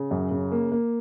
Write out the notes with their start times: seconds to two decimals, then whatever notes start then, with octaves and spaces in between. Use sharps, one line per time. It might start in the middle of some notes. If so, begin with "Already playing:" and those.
Already playing: C#3
0.11 F#2
0.31 C#3
0.52 A#3
0.72 A#3